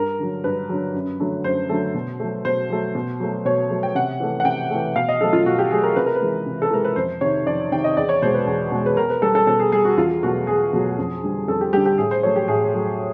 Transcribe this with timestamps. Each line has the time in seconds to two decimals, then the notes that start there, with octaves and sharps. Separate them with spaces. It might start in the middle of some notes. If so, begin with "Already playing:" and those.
Already playing: G2 A#4
0.19 D3 F#3
0.44 G2 B4
0.69 D3 F#3
0.94 F#2
1.20 D3 F#3 A3
1.44 F#2 C5
1.69 D3 F#3 A3
1.94 B2
2.20 F#3 A3
2.45 B2 C5
2.70 F#3 A3
2.95 B2
3.20 F#3 A3
3.45 B2 C#5
3.70 F#3 A3
3.83 G5
3.95 C3 F#5
4.20 E3 A3
4.40 F#5
4.45 C3 G5
4.71 E3 A3
4.96 B2 F5
5.09 D#5
5.21 F#3 A3 A4
5.33 F4
5.46 B2 F#4
5.59 G4
5.71 F#3 A3 G#4
5.83 A#4
5.96 C3 B4
6.06 A#4
6.15 B4
6.21 E3 G#3
6.46 C3
6.62 A4
6.71 E3 G#3 A#4
6.85 B4
6.96 F2 C5
7.21 C3 D#3 C#5
7.47 F2 D5
7.72 C3 D#3 G5
7.84 D#5
7.97 E2 D5
8.09 C#5
8.22 B2 G#3 C5
8.34 B4
8.47 E2
8.72 B2 G#3
8.86 B4
8.97 B2 A#4
9.10 B4
9.22 G3 A4
9.35 A4
9.47 B2 A4
9.60 G#4
9.72 G3 G#4
9.85 F#4
9.97 E2 F4
10.23 B2 F#3 A3 F#4
10.47 E2 G#4
10.73 B2 F#3 A3
10.98 F2
11.23 D3 G3
11.48 F2 A4
11.61 G4
11.73 D3 G3 G4
11.86 G4
11.98 A2 G#4
12.11 C5
12.23 F#3 A3 C#5
12.36 G4
12.48 A2 G#4
12.74 F#3 A3